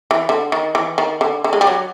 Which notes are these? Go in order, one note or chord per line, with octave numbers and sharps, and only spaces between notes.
E3
D3
D#3
E3
D#3
D3
D3
G#3
G3
F#3